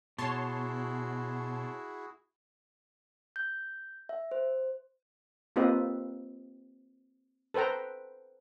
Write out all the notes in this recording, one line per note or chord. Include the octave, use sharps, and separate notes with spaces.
B2 E4 F#4 G#4 C#5 A5 C6
G6
E5
C5
A#3 C4 F4 G4 B4 D#5
A4 B4 C5 G5 A#5